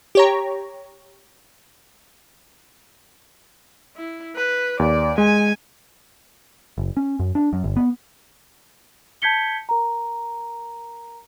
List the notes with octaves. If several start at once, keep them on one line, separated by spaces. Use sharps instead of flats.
G4 C#5 A#5
E4
B4
D#2 D5
G#3 G#5
F#1
C#4
F#2
D4
F#2
G1
B3
A5 G6 G#6 B6 C#7 G7
A#4 A#5